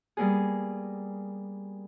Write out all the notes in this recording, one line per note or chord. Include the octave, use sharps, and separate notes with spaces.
G3 A#3 B3 G#4